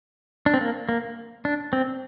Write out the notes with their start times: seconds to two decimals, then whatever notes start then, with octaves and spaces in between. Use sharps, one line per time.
0.46 D4
0.54 C4
0.61 A#3
0.89 A#3
1.45 D4
1.73 C4